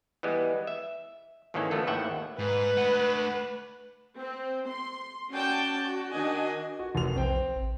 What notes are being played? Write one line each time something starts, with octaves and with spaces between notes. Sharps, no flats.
E3 G3 G#3 B3
E5
G#1 D#3 E3 A#3 C#4 A4
C#3 F3 A3 B3 A4
G#1 D#2 A2 E5 F#5 G5
G#2 B4
A3 F#5
C4
C6
C#4 F#4 D5 G5 A5
F#4
D#3 D4 F#4 D#5 G#5
F#4
F1 F7
B1 C4 G5
A1